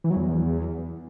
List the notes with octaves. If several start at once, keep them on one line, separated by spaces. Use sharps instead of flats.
E3
F#3
E2